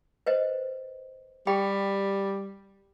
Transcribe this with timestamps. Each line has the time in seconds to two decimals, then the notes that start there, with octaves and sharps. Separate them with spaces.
0.26 B4 C5 D#5
1.47 G3 G4 G5 B5